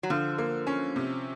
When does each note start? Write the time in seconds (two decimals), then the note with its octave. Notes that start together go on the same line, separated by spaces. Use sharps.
0.03 F#3
0.10 D3 F3
0.38 A#3
0.67 C#4
0.96 C3